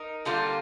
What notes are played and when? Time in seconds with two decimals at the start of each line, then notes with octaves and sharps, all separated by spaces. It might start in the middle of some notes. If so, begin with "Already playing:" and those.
Already playing: D#4 A#4
0.25 D3 G3 A#3 F4